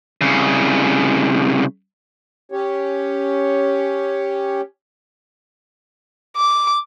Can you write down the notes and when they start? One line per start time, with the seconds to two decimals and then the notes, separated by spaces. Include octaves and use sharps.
0.21 C2 C#3
2.52 C#4 G4 C#5
6.36 D6